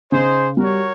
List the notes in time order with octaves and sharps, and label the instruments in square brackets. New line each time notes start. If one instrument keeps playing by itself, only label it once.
[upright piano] C#3 [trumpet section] D#4 G#4 C5
[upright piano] G3 [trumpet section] F#4 A#4 C#5